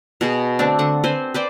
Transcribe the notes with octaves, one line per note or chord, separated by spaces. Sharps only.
B2 F#4 G#4
D3 A3 C4 D4
D3 F#5
C4 B4 C5 G#5
B4 C5 D5 G5